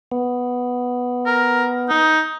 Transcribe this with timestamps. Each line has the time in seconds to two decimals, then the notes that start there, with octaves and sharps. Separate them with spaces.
0.12 B3
1.26 A#4
1.89 D#4